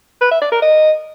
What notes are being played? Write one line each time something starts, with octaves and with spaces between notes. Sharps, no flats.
B4
E5
D5
A#4
D#5